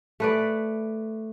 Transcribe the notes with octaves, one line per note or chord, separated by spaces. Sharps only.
A3 B4 D5